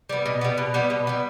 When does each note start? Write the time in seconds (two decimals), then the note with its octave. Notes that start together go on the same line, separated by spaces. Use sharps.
0.09 G3 B3
0.26 B2
0.41 G3 B3
0.58 B2
0.74 G3 B3
0.90 B2
1.07 G3 B3